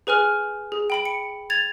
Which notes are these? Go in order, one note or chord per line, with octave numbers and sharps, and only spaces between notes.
G#4 B4 G#5 F6
G#4
G5 B5 D7
C#7
G#6 A6 F7